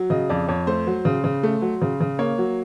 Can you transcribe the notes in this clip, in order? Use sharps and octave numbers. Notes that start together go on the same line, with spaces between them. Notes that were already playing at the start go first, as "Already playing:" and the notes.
Already playing: F#3
C#3 D#5
F2 D5
F2 C#5
A3 C5
F#3
C#3
C#3
A3
F#3
C#3
C#3
A#3 C#5
F#3